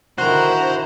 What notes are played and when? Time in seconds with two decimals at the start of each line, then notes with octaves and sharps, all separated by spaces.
0.18 D3 D#3 E4 F#4 C5 A#5